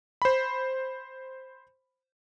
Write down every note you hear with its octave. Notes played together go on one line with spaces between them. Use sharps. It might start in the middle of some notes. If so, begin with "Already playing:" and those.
C5 B5